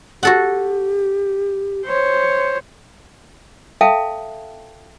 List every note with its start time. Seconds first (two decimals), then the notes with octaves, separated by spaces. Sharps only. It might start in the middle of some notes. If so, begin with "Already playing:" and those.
0.23 F#4 G4 A4 F#5
1.86 C5 C#5
3.81 A4 E5 F5 G5 A5